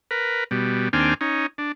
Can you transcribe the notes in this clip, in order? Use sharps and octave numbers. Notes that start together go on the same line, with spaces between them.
A#4 B4
B2 G3
D#2 C4 D4 G5 G#5 F6
C#4 D#4
D4